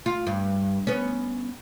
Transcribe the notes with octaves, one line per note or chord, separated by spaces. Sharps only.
F4
G2
B3 C#4